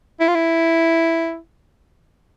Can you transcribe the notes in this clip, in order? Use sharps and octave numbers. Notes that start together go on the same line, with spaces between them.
E4
F4
E4